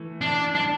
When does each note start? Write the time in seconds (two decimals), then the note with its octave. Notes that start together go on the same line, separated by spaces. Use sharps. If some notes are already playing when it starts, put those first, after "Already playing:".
Already playing: E3 A3
0.21 D4
0.55 D4